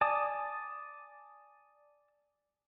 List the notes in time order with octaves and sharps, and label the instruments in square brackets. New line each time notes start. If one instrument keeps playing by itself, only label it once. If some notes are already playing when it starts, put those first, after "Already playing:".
[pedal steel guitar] D5 G#5 A5 D6 D#6